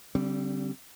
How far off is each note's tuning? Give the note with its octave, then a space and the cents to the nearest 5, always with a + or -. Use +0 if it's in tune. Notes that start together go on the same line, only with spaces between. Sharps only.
D3 -40 G3 -20 C4 +0